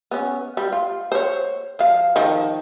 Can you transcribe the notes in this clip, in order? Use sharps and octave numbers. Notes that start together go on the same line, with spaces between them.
B3 C#4
G3
F4
C5 C#5
F3 F5
D#3 F3